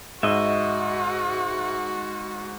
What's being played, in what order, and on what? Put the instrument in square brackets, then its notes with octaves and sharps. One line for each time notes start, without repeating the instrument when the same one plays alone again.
[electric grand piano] G#2 [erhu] F#4 [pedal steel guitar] D#5 E5